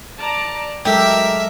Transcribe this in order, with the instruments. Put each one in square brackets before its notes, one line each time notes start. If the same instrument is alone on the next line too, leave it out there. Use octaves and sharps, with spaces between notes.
[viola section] D5 A5 A#5
[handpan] F#3 G#3 A4 [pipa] G4 [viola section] A#4 [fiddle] E5